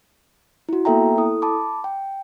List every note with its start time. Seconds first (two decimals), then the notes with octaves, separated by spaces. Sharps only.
0.69 E4 F#4
0.85 A#3 B3 A4 E5 G5 A#5
1.18 E4 A4 D#6
1.42 A5 B5 D6
1.84 G5